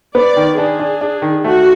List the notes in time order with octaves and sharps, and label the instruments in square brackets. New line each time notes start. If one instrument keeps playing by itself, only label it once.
[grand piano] B3 [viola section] D5
[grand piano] D#3
[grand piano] D4 [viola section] G#4
[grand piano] D4
D4
D#3
[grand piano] A3 [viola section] F#4